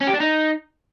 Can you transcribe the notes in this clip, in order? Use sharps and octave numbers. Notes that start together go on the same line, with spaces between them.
C#4
G4
D4
D#4